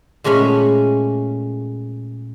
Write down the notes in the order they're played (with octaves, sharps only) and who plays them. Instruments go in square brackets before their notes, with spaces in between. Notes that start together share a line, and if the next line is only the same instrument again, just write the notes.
[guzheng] A#2 G#3 A3 C#4 B5